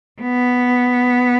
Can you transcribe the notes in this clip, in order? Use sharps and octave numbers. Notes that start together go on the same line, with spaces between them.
B3